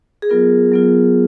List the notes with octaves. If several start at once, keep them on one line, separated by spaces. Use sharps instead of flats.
G#4
F#3 B3 F4 A#4
F#3 B3 F4